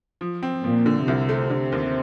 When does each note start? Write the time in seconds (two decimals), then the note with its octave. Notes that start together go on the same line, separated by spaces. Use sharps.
0.21 F3
0.43 C4
0.64 A#2 F3
0.86 D3
1.07 C2 C3
1.29 A3
1.50 D3
1.72 D#2